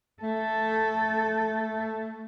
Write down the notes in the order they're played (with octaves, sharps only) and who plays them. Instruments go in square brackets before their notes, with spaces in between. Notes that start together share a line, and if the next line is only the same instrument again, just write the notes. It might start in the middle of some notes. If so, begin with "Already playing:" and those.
[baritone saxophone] A3 [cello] A4